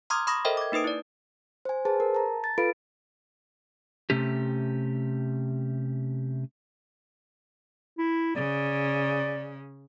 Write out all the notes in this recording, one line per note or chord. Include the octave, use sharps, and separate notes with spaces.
A#5 C6 D6 D#6 F6 G#6
B5 C#6 D#6 A#6
A4 A#4 C5 D#5 E5 G5
D6 G#6
A#3 D#4 B4 D#6 D7
E4 D5
C5 G#5
G#4 B4 C5 A5
A#4
A5 A#5
A6
F4 A4 B4 F5 B5 D7
C3 A3 C#4 G4
E4
C#3 D5